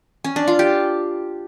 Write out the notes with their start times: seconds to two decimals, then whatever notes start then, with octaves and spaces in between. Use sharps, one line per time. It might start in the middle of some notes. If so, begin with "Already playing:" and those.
0.24 C#4
0.36 D4
0.48 F4
0.59 G4